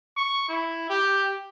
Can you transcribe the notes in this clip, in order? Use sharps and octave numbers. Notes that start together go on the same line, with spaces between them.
C#6
E4
G4